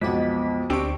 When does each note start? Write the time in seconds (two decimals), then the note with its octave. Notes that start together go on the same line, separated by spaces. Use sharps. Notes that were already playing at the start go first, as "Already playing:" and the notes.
0.01 B1 F2 G#3 B3 D#5 D6 B6
0.70 D2 C4 D4 G4 C#6